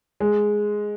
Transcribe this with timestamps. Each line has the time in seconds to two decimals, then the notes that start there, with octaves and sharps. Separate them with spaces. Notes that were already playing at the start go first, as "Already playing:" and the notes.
0.20 G#3